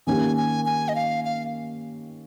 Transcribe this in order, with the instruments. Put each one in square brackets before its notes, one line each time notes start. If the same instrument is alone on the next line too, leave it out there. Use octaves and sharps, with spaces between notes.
[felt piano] D#3 A#3 C#4 G4 [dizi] G#5
[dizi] G#5
G#5
D#5
F5
F5